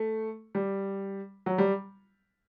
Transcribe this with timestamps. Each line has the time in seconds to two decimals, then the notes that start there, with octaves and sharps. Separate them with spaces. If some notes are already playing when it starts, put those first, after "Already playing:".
Already playing: A3
0.55 G3
1.46 F#3
1.58 G3